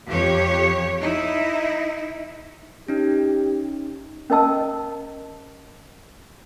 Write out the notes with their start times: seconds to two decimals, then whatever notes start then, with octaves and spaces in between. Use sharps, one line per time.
0.10 F2 G4 C#5
1.01 D#4 E4
2.88 C#4 D#4 G4
4.30 C#4 A#4 D#5 A5 E6